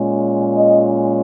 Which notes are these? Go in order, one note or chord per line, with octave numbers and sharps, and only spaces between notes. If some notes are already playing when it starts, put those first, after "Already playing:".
Already playing: A#2 G#3 C#4
D#5